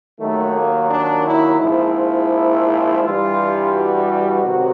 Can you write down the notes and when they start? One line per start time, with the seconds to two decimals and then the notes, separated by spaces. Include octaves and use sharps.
0.19 D#2 D#3 F#3 A3
0.53 A#3
0.90 D4
1.24 E4
1.60 A#1 G#2 F3 E4
3.01 G2 E3 G3 F4
3.72 F#4
4.42 C#2 C3 D#3 F#3